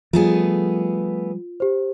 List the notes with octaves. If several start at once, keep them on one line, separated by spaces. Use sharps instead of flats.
F3 G3 A3 B3 F4 G#4
G4 C5